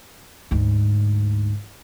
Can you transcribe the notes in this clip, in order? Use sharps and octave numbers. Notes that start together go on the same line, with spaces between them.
D2 G#2